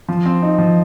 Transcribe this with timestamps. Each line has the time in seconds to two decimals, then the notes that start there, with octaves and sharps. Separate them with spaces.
0.09 F3
0.25 C4
0.42 D#4
0.58 F3